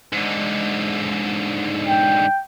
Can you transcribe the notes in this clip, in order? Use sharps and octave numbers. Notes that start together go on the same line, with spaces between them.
G#2 D3
G5